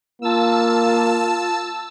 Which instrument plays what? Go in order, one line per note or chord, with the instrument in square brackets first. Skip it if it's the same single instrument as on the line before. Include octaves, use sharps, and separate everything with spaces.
[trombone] A#3 [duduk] F4 [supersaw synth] A5 E6